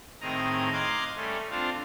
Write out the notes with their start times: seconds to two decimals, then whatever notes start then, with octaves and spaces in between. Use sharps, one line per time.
0.21 A2 D#3 C4 G#4 D#5 A#5
0.73 D#5 F5 C6 D6 F#6 G#6
1.16 G3 A3 C#4
1.50 C4 D4 F4 C5 F5